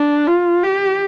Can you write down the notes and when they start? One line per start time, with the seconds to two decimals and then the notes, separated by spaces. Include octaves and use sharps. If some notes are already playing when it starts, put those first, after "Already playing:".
Already playing: D4
0.26 F4
0.63 G4